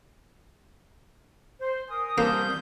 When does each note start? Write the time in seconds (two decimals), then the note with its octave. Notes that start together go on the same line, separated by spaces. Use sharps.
1.61 C5
1.89 A#4 G#5 D#6
2.18 G3 A#3 C4 A5 G6